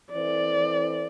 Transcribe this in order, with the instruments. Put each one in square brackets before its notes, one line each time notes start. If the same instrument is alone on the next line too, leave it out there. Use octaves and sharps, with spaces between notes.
[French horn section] E3 C4 E4 A4 C5 [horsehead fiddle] D5